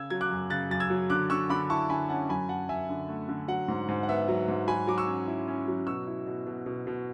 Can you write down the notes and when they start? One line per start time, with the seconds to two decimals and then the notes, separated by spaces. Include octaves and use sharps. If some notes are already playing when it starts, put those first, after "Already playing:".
Already playing: C#3 E6 G#6
0.10 F#3 G#6
0.21 D6 F#6
0.31 F#2
0.50 C#3 F#6 A6
0.70 F#2 A6
0.80 E6 G#6
0.90 F#3
1.10 D3 D6 F#6
1.30 D3 C#6 E6
1.49 D3 B5 D6
1.69 E4 A5 C#6
1.89 D3 G#5 B5
2.09 C#4 F#5 A5
2.29 F#2 G#5 B5
2.49 F#2 F#5 A5
2.69 F#2 E5 G#5
2.89 D3
3.09 A3
3.28 D3
3.48 F#3 F#5
3.68 G#2
3.88 G#2
4.03 F#5
4.08 B3 E5
4.28 F#3
4.48 G#2
4.68 F#3 G#5 B5
4.87 F#3 D6
4.98 C#6 E6
5.07 C#4
5.27 E4
5.48 C#4
5.68 F#3
5.87 B2 C#6 E6
6.07 E4
6.27 B2
6.47 B2
6.66 B2
6.87 B2